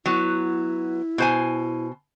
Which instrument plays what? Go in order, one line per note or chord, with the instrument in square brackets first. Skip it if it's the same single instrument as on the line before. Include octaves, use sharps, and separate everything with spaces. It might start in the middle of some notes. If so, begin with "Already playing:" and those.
[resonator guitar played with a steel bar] F#3 B3 [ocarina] E4
[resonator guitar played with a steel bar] B2 C5 G#5